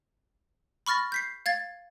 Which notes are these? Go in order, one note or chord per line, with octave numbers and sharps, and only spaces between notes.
B5 C#6 F6 A6 A#6
G6 B6 C7
F5 G#6 A6